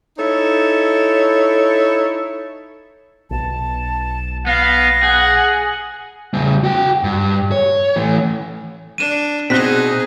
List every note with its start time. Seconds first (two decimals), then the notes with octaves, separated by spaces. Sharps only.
0.18 D#4 E4 A4 C#5
3.31 B1 B2 A5
4.47 B3 F5 A#6
5.03 G#4 F#5
6.34 C#3 G3
6.64 F#4 G5
7.04 G2
7.52 C#5
7.96 E3 A3
8.98 D4 D#7 E7
9.50 B2 C4 D#4 G#4 F#6 B6